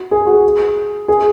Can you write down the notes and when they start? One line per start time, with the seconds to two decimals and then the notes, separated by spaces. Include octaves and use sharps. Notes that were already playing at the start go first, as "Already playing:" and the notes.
Already playing: F#4
0.11 G#4
0.26 F#4
0.32 G#4
1.08 G#4